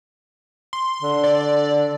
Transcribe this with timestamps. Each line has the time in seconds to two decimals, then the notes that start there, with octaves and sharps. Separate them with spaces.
0.73 C6
1.02 D3
1.24 D5